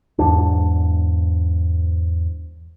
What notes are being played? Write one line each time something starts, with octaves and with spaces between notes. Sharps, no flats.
E2 G#2 D4